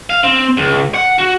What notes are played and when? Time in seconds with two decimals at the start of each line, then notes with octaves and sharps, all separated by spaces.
0.10 F5
0.24 C4
0.57 C#2
0.94 F#5
1.19 F#4